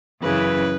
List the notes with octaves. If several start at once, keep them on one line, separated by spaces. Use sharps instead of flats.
F#2 C#3 E3 B4